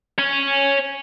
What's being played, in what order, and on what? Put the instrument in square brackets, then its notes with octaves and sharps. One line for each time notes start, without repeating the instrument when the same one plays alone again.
[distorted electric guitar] C#5 G#5